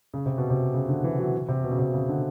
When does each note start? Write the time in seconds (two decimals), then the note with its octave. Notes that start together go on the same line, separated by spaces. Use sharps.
0.14 C#3
0.26 C3
0.38 B2
0.50 C3
0.74 C#3
0.89 D3
1.04 E3
1.19 F#3
1.49 C3
1.64 B2
1.71 C#3
1.79 C3
1.94 C#3
2.09 D3